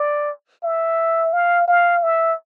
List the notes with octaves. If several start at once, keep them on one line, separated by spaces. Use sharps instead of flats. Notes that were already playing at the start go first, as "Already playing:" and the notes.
Already playing: D5
E5
F5
F5
E5